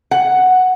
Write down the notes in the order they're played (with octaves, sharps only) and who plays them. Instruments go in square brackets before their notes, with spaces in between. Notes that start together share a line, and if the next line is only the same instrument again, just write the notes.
[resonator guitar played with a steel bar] F#5